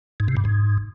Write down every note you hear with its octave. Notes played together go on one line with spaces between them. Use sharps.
G#2
C3
G2
G#2